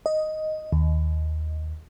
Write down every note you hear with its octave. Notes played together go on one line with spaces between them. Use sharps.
D#5
D#2